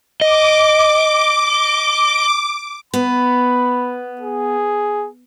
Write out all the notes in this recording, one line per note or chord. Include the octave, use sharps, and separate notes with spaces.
D#5 D6
B3 B5
G#4